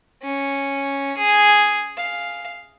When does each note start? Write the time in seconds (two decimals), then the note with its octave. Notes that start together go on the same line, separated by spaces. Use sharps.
0.23 C#4
1.18 G#4
1.97 F5